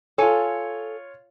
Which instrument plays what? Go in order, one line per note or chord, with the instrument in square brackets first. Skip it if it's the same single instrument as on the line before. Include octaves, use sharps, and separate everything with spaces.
[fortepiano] F4 C#5 [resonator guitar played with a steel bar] A4 G#5